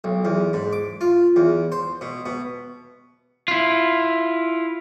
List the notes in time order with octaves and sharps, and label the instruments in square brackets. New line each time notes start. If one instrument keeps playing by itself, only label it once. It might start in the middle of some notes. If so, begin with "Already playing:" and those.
[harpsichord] B1
E2
G#2
D6
F4
E2
C5
B2
B2
[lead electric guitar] E4 F4